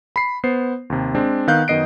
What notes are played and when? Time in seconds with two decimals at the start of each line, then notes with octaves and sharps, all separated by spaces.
0.16 B5 C7
0.44 B3 C5 C7
0.90 D#2 C3
1.15 G#3 C4 D4
1.48 D#3 B3 F5 F#6 G6
1.68 F#2 D#3 B3 D#5 C7 D7